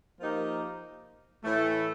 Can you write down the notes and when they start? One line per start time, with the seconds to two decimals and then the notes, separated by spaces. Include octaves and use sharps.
0.20 F3 A#3 D#4 G4 A#4
1.43 A2 E3 A3